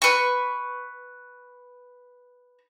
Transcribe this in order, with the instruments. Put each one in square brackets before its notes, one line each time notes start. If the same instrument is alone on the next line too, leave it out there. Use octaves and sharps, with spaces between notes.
[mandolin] B4 C#6